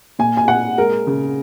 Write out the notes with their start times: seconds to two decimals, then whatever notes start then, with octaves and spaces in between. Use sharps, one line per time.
0.19 A#2 G#5
0.37 G#5
0.48 A#2 F#5
0.78 G#3 A#4
1.07 C#3